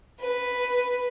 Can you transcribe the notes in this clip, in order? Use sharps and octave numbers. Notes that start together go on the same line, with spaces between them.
B4